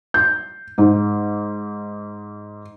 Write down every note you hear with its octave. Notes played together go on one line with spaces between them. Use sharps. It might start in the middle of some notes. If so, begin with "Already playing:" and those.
G6
G#2